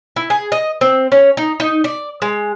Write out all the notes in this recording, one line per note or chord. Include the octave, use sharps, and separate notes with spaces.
E4
G#4
D#5
C4
C#4
D#4
D#4
D5
G#3